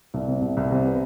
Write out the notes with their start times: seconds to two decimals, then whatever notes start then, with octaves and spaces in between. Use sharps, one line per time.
0.14 C2
0.28 C3
0.42 C2
0.57 C2
0.71 C3
0.86 B3